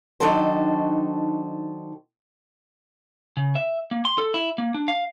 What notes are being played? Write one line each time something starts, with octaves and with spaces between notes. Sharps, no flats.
D#3 F#3 D4 D#4 A4 C5
C#3
E5
A#3
C6
A4
E4
A#3
D4
F5